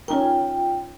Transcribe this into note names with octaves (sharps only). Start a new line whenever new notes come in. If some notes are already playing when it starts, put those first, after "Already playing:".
C#4 D#4 F4 A#4 G5